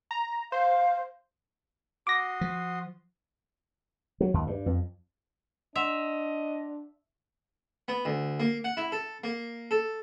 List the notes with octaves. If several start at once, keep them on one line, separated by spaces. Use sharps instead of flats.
A#5
C5 F5
F#4 C6 D6 D#6 A#6
F3
F#3
D#2
G2
F2
D4 D#5 E5 F#5 C6 F7
B3
D2
A#3
F#5
E4
A4
A#3
A4